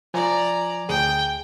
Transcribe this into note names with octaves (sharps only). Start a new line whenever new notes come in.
F3 D5 G#5 A#5 G#6
D2 G#4 G5